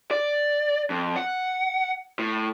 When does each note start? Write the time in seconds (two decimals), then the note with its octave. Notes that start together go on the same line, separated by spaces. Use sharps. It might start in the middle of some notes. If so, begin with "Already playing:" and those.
0.11 D5
0.90 F2
1.17 F#5
2.19 A2